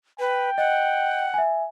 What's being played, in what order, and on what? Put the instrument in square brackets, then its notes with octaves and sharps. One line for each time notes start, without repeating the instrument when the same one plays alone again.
[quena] B4 [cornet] G5
[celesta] D#5 [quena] F#5
[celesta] E5 G#5